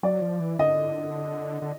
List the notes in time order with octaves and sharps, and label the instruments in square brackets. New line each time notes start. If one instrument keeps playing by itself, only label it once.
[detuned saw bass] F#3 [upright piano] D5
[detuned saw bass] F3
E3
[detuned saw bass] D3 [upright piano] D#5
[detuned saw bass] D3